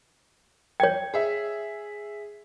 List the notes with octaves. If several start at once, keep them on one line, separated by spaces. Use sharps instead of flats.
C#5 G5 G#6
G#4 E5